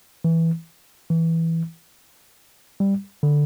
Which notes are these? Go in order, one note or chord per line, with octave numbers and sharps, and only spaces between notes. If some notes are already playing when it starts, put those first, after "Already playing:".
E3
E3
G3
D3